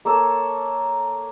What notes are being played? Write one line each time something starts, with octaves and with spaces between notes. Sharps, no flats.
A#3 A4 C#5 E6